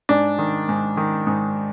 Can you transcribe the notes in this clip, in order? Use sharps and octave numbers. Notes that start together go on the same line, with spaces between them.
G#2 D4
D#3
G#2
D#3
G#2